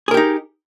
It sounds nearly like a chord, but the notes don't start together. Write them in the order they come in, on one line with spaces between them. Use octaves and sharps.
G#4 A#4 G4 D#4